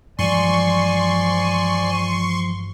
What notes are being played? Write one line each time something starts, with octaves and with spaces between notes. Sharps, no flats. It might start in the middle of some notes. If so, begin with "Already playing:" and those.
G2 E3 F3 G#3 D5 G#5 C6 C#6